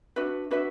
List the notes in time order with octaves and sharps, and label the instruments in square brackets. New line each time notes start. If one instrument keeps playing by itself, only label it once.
[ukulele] D4 F#4 B4 E5
D4 F#4 B4 E5